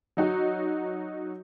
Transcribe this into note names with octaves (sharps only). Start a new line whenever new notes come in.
F#3 D#4 F#4